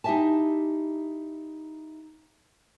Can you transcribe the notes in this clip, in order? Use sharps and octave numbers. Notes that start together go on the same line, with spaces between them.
D#4 E4 G4 E5 G#5 A5